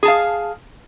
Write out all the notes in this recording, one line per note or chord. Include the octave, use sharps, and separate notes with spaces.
G#4 F5 A5